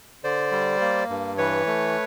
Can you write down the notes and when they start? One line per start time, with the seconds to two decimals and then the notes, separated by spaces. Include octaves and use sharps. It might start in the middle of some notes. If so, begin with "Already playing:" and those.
0.24 D3 C5 D5
0.52 G3
0.81 A#3
1.09 G2
1.38 E3 B4 C#5
1.67 A3